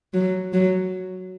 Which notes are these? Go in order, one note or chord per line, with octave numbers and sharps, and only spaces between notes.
F#3
F#3